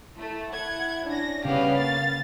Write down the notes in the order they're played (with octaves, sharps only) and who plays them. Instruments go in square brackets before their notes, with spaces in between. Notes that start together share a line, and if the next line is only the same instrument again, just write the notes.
[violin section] A3 [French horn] E4
[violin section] F#5 G#6
[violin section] C#4 A#6 [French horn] D4
[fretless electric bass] C#3 [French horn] G3 [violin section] B3 C#4 G4 [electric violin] F5
[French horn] A#3 [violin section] A6